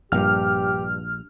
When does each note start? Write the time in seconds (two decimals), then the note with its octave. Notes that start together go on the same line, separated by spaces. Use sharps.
0.12 A#1 G2 A#2 G4 F6